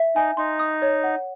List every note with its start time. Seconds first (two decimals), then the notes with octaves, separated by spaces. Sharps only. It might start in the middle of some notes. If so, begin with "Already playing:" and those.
Already playing: E5
0.16 D#4 G#5
0.37 D#4 C6
0.59 D#6
0.82 C#5
1.04 F#5